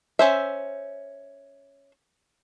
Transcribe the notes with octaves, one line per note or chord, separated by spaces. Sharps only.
C#4 C5 E5